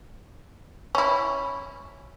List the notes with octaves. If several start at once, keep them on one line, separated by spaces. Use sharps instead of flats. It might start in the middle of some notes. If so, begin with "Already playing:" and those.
C#4 E4